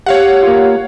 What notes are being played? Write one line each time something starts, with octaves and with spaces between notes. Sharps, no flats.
G4 C#5 F5 F#5
A#3 F4